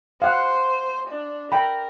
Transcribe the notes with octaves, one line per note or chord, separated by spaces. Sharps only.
C5 F5 F#5
D4
A#4 G5 B5